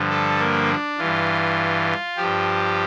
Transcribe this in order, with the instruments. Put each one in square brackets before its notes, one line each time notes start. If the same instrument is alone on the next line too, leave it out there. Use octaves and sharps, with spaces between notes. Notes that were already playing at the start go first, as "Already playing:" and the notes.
Already playing: [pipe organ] G2 D3 F3
A4
A#3
D4
G2 E3 F4
G2 F3 G4